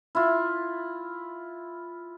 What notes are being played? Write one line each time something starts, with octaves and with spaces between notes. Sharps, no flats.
E4 F4